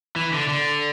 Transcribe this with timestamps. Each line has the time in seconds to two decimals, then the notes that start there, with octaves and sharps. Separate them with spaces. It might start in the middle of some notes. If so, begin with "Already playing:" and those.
0.16 E3
0.33 D3
0.48 D3